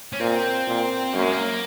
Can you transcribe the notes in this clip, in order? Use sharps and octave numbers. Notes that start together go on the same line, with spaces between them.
C#4
A#2 C4
A#2
F#2 A#3
G#3
A#3